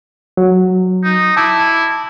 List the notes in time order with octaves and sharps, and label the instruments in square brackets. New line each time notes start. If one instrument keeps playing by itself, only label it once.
[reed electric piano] F#3
[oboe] D#4
[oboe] E4 [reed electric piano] A5 D6